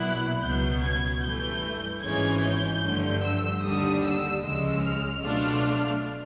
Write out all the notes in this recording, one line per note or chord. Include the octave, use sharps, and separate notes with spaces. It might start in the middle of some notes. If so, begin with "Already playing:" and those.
Already playing: B1 A#2 F#3 B3 E4 F#6
C#2 B2 F#3 B3 G6
G#6
G2 E3 A3 G6
G#1 G#2 E3 G#3 C#4 G#6
G6
G2 D3 F3 A3
E6
D#2 D3 G3 D#6
E6
C#2 C#3 F3 G#3 E6
F6
B2 F#3 A3 D4 F4